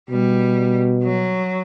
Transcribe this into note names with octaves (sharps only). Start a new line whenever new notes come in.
B2 G3
F#3